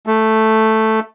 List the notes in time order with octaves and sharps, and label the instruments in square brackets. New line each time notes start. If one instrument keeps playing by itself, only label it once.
[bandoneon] A3